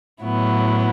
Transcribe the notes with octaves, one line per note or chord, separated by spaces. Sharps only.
A2 F#3 B3 E4